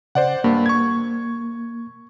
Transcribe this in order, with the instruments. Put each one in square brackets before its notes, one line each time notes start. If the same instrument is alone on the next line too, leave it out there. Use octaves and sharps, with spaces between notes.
[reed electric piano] C#3 [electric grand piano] C5 D5 F#5
[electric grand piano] G2 [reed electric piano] A#3
[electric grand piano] C#6 G#6